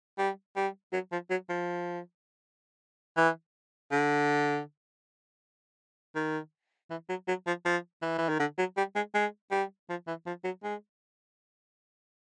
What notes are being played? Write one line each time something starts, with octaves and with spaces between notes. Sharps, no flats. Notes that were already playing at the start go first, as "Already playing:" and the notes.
G3
G3
F#3
F3
F#3
F3
E3
D3
D#3
E3
F#3
F#3
F3
F3
E3
E3
D#3
D3
F#3
G3
G#3
G#3
G3
F3
E3
F3
F#3
G#3